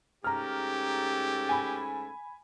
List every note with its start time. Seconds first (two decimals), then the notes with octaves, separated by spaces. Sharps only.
0.24 G#2 A3 C#4 G4 A#5 F6
1.49 G#5 B5